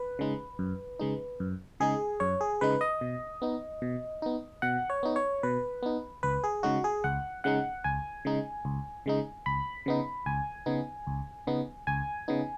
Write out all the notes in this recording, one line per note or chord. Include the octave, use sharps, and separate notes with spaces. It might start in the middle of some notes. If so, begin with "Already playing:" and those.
Already playing: B4
C#3 G#3 D#4
F#2
C#3 G#3 D#4
F#2
C#3 G#3 D#4 G#4
F#2 C#5
G#4
C#3 G#3 D#4 B4
D#5
B2
B3 D#4
B2
B3 D#4
B2 F#5
C#5
B3 D#4
C#5
B2 B4
B3 D#4
C#2 B4
G#4
C#3 G#3 D#4 F#4
G#4
C#2 F#5
C#3 G#3 D#4 F#5
C#2 G#5
C#3 G#3 D#4
C#2
C#3 G#3 D#4
C#2 B5
C#3 B3 D#4
C#2 G#5
C#3 B3 D#4
C#2
C#3 B3 D#4
C#2 G#5
C#3 B3 D#4